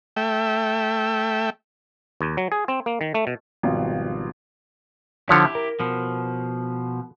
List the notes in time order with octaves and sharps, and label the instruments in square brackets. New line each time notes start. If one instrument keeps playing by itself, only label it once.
[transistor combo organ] A3 E5 G5
[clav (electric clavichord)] D#2
F#3
G#4
C4
A#3
D#3
A3
B2
[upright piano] G#1 B2 F3 G3
[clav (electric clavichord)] D3 F3 C#5 [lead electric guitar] E4 G4
[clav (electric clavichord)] A#4
[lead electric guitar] B2 F3